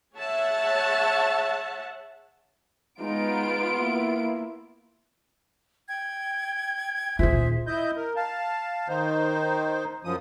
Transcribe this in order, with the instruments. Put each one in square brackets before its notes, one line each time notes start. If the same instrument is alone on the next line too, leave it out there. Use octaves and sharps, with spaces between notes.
[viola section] G#4 C#5 E5 F#5 A5
[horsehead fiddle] G#3 D#4 [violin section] B3 F4 D7
[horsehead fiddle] A#3 E4
[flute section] G5 G#6
[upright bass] D#1 F4 [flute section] G#4 C5 E5
[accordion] E4 D#5 G6
A#4
F5 A5
D#3 D#4 C5
F#2 F3 D#6